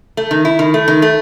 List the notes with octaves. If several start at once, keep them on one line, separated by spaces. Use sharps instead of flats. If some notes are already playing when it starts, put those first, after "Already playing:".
A3
D#3
E4
D#3
A3
D#3
A3